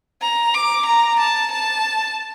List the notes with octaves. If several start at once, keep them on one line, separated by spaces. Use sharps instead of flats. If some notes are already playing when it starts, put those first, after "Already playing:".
A#5
D6
A#5
A5
A5